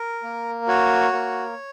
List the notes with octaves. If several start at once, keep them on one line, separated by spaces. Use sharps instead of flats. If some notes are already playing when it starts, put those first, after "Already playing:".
Already playing: A#4
A#3
F#4 C#5
A#3